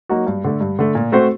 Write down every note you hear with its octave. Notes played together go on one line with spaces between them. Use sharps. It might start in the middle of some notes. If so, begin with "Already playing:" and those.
F#3 A#3 D#4 F#4
G2
D3 A3
G2
D3 A3
A#2
A3 C4 F#4 C5